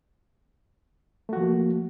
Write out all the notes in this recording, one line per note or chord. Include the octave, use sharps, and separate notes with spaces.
F3 A3 A#3 F#4